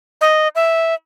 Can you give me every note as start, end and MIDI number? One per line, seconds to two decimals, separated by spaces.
0.21 0.48 75
0.55 0.94 76